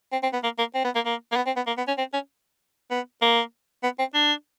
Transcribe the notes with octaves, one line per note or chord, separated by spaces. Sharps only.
C4
C4
B3
A#3
A#3
C4
B3
A#3
A#3
A#3
B3
C4
B3
A#3
B3
C#4
C4
C#4
B3
A#3
B3
C4
D4